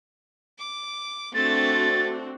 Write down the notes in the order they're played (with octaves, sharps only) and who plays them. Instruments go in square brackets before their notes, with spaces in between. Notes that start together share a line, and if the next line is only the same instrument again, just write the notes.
[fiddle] D6
[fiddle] A3 [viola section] C4 D4 F#4 [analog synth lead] A6